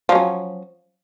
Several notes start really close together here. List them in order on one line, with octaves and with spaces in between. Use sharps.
F3 F#3 C#4